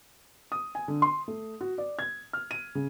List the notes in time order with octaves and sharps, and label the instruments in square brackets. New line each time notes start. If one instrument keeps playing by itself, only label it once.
[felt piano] D#6
G#5
D3
C6
A3
F#4
D5
G#6
F6
D#7
C#3